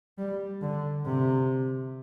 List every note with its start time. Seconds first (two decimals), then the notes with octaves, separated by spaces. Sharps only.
0.18 G3
0.62 D3
1.06 C3